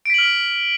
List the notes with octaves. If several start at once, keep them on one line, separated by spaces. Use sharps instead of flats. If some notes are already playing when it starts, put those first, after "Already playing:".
F6 B6 D7 F#7